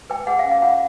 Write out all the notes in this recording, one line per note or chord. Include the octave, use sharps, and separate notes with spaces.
B4 G5
G#4 F#5
F5
C#4
F5
F4 F#5